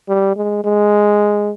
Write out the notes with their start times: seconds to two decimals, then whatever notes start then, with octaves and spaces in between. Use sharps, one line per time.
0.09 G3
0.36 G#3
0.64 G#3